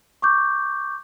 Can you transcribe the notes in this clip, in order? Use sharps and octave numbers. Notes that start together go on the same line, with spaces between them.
C#6 D6 G6